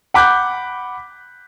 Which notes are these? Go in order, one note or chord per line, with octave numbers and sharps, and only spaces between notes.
F#5 B5 D6 F#6 G6